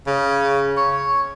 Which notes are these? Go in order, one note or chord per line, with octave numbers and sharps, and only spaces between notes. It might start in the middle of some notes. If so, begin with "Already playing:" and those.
C#3
C#5